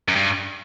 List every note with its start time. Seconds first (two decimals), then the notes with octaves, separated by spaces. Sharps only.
0.08 F#2
0.16 G2